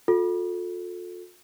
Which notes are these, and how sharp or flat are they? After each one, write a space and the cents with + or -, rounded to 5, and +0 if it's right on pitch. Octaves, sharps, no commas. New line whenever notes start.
F4 +40 A4 +0